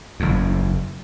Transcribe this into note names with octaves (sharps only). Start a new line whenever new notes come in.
F#1 E2